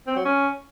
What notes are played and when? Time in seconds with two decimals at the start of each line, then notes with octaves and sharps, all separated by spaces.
0.07 C4
0.16 F#3
0.25 C#4